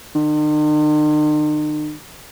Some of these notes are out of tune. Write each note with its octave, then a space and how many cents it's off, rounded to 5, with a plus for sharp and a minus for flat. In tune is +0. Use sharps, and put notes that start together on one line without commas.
D#3 -45